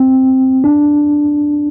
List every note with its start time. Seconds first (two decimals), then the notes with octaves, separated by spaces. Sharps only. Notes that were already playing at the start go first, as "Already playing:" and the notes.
Already playing: C4
0.64 D4